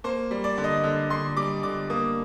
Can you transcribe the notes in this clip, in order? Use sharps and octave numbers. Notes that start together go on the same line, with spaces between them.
A#3 C5
G3
D5
D3
D#5
D3
D3 C6
G3 D6
D3 D6
A#3 D#6